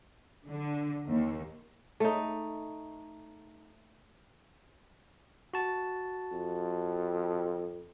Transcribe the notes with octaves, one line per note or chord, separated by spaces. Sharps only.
D3
D#2
A3 D#4
F#4 A5
F2